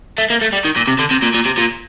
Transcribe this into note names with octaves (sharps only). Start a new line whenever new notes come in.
A3
A#3
A3
G3
D#3
A#2
C3
D3
C3
A#2
A#2
C3
A#2